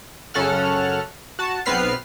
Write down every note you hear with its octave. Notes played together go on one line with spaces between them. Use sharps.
F#2 C#3 C#4 A4 F#5 F6
F#4 A5
B1 B3 C4 B4 F6 C7